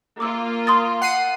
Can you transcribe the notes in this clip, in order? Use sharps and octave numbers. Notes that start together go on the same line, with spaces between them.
A#3 F4 D6 E6
C6 D#6 A6
F#5 C7 D#7